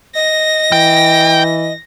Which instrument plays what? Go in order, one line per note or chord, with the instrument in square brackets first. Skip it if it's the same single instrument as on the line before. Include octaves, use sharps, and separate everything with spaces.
[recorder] D#5 [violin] A#6
[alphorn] E3 [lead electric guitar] G5